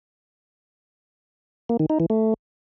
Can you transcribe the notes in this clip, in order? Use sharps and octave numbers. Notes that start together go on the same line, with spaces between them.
A#3
D#3
D#4
E3
A3